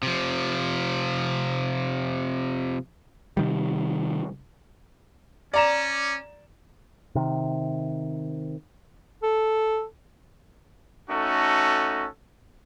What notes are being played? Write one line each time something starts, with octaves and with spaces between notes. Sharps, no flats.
C3 F3
C3 D#3 G3
C#4 D5 A#5 E7
C3 D#3
A4
A3 C#4 D#4 F#4 A4